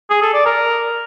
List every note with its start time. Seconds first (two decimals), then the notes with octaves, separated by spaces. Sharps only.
0.10 G#4
0.22 A4
0.34 D5
0.46 A#4